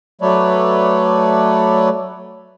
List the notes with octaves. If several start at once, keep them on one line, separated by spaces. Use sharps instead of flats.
F#3 A3 A4 B4 C#5 D5